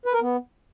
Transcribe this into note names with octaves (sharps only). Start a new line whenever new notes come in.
B4
A#4
B3